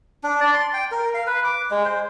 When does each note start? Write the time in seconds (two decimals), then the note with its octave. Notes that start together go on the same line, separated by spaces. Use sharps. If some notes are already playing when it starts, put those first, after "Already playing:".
0.23 D4
0.40 D5
0.54 C6
0.73 G5
0.91 A#4
1.14 F5
1.27 B4
1.44 D6
1.71 G#3
1.85 C5